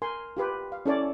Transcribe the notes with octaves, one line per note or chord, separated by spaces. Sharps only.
A#4 G#5 C6
F4 G4 B4
F5
C#4 E4 A4 C#5 D5